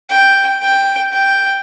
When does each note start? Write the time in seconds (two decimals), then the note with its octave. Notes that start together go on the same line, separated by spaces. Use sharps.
0.10 G5
0.62 G5
1.13 G5